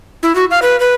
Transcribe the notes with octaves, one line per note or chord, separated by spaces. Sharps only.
E4
F#4
F5
B4
B4